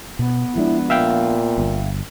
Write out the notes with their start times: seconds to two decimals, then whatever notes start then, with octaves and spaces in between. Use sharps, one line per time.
0.19 B2 B3
0.56 F3 G#3 D4 E4
0.90 A#2 E5 F5 G5
1.58 G1